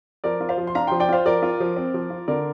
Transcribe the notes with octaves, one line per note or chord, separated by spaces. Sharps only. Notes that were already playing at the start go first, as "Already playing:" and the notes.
F3 A#4 D5
F4
C5 F5
F3
C6
D4 F5 A#5
F3 G5 C6
D5 G5
F4 C5 F5
F3 A#4 D5
F4
F3
C4
F3
F4
D3 A#4 D5